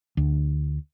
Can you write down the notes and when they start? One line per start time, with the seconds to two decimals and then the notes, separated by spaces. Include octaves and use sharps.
0.17 D2